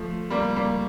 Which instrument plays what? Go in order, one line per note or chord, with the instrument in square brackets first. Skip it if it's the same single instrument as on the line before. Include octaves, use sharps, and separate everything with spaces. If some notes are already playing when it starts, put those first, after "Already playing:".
Already playing: [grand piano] F3 A3
G3 A#3
G3 A#3